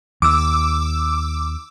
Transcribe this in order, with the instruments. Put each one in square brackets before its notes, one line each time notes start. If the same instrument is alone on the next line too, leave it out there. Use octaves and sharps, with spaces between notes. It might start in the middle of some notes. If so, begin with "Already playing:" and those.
[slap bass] D#2 [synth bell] D6 E6